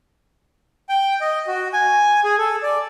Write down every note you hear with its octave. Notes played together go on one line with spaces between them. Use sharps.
G5
D#5
F#4
G#5
G#4
A4
D5